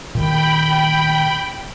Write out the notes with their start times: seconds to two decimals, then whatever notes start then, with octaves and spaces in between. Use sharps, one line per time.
0.15 A#2 D#3 G5 B5